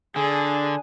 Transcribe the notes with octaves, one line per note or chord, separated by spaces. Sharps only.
D3 D4 G#4 G#5